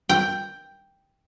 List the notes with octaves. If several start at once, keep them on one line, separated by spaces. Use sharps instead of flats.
G5